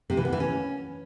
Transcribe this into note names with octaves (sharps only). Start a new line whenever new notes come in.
C3
E3
B3
E3
C#4